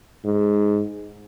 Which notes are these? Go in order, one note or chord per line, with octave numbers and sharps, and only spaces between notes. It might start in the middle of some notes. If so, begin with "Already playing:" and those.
G#2